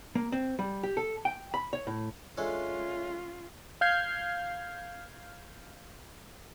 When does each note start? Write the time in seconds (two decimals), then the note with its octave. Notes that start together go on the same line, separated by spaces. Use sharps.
0.16 A#3
0.32 C4
0.59 G3
0.83 G4
0.97 A4
1.25 G5
1.54 B5
1.73 C#5
1.87 A2
2.38 G#3 C#4 D4 F4 A4 C#5 E5
3.81 F5 F6 G6 G#6 C7